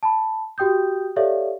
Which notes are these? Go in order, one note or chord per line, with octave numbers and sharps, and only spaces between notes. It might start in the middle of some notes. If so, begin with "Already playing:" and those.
A5 B5
F#4 G4 G5 D#6 G6
G4 A4 C#5 D5 E5 F5